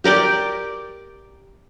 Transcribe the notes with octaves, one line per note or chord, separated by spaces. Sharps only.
G4 A#4 D5 G5